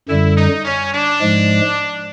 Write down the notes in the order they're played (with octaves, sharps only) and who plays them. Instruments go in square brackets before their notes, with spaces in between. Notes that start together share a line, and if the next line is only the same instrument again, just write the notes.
[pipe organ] F#2 D3 G3 [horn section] E4
[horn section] D#4
C#4
D4
[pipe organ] G#2 F3 G#3